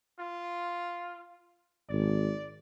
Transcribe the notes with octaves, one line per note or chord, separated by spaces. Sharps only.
F4
G#1 D5